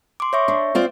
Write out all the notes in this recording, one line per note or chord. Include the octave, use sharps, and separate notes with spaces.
C6 D6
C#5 E5 C#6
D4
C4 F4 D5